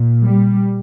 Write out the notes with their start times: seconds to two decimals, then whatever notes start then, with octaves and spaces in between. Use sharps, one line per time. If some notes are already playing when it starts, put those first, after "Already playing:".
Already playing: A#2
0.24 G3